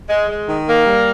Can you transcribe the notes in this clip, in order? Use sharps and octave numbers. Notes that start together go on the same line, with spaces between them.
G#3
G#3
D#3
A#3
G3